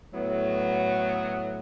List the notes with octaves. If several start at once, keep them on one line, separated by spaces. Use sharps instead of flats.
A2 F#3 B3